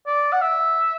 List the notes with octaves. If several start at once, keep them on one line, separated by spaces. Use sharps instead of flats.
D5
F#5
E5